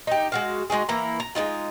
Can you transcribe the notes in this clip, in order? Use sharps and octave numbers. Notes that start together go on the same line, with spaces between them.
D#4 G4
G#3 F#4 F5
G#3 D#4 F#4 G#4
E3 A#3 E4 A#5
A#5
G#3 B3 D#4 F4